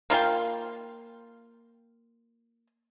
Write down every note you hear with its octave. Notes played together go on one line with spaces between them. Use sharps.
A#3 F4 F5 G5